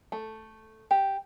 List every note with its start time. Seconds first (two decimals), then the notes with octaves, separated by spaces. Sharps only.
0.12 A3
0.91 G4